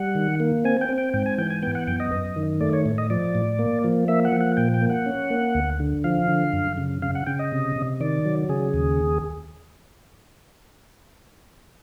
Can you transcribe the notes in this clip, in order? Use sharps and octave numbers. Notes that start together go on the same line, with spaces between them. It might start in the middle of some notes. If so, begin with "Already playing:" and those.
Already playing: G3 F#5
D#3
A#3
C4 G#5
G5
C4
G5
G#2 G5
G#5
E3 G5
G#5
B3 G5
F#5
F#2 G5
D#5
F#2
D#3
A3 D5
C#5
A2
D#5
F3 D5
A2
A#3
F3
A#3 E5
F#5
F3
F#5
A#2 G5
G5
A#3
F#5
C#4
A#3
D2
D3
F3 F5
D3
F#2
C#3
C#3 F5
F#5
C#3 G5
D#5
C3
C3
D#3 D5
F#3
C#3 G#4
D#2